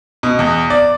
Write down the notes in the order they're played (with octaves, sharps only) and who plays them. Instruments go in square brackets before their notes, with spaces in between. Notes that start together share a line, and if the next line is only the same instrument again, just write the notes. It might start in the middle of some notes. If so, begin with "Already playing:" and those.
[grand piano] B2
E2
D5